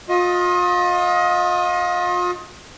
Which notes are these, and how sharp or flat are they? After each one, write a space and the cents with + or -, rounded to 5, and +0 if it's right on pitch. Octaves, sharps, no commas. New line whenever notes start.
F4 +35 D#5 +20 D#6 +0